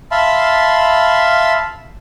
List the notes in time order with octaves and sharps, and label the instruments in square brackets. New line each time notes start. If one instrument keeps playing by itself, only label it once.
[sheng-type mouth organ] E5 F5 A5 B5 C6